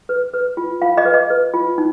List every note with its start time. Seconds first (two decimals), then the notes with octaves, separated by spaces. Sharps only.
0.09 B4
0.34 B4
0.57 F4
0.82 F4 F5
0.97 D#5
1.05 B4
1.14 D#5
1.30 B4
1.54 F4
1.78 D#4